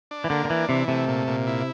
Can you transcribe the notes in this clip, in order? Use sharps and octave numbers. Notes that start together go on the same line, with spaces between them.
D4
E3
D3 A#3
D3
E3 D4
C3 E3
C3 A3
A#2
A#2
E4